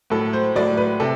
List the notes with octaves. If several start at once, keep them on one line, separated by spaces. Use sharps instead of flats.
A2 F#3 A4
C5
A2 F#3 D5
B4
C3 A4